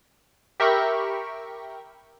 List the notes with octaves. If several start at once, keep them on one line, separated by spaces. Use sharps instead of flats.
G4 A#4 E5 G5 B5 C#6